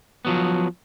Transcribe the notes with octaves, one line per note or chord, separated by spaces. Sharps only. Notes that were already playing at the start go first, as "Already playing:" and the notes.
F3 F#3 B3